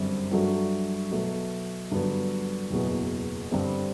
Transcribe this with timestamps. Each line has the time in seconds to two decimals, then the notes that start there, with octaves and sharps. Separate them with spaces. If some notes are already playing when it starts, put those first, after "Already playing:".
Already playing: G1 F#2 D3 G3 C4
0.32 G2 F#3 A3 D4 F#4
1.11 B2 F#3 A3
1.92 G2 D3 F#3 B3
2.70 F#1 E2 B2 F#3
3.51 G2 D3 G3 C4